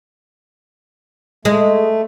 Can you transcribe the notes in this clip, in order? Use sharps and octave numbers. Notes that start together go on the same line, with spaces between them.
G#3 A3